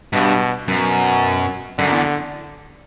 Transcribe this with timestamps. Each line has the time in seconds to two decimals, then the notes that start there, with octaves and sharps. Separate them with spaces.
0.13 G2 B2
0.68 F#2 B2
1.78 F#2 D3
1.92 E2